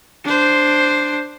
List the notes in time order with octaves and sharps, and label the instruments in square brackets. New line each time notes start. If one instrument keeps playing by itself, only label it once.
[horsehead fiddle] D4 C5